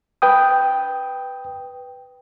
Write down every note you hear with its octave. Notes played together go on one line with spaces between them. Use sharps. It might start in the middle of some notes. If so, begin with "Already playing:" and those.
B4 G5 D#6